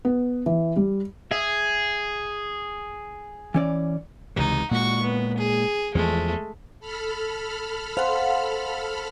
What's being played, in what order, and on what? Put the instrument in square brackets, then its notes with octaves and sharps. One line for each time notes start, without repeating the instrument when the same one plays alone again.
[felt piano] B3
E3
G3
[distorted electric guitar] G#4 [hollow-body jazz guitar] E5
[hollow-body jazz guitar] E3 C#4 D5
[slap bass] C#2 C3 E3 [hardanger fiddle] D#4
[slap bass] A#2 G#3 [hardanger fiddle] F#4 C#6
[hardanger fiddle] B3
G#4
[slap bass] E2 F3 [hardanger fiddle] G#3 A3
[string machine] A4 B5 F6
[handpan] C5 [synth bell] F5 F#5